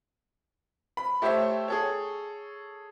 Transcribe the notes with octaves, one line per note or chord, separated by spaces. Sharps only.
B5
A3 G4 C5 C#5 E5
G#4 A4 C#5